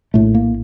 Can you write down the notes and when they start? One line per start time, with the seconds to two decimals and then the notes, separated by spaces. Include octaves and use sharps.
0.14 A#1 A2 A3
0.35 A#3